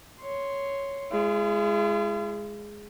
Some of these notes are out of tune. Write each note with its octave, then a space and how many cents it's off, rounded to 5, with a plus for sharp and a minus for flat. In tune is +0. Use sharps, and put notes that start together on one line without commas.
C#5 +0 C6 +0
G#3 +0 F4 -45